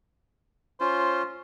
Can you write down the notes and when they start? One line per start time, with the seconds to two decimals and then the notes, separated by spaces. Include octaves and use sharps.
0.80 C#4 F4 C5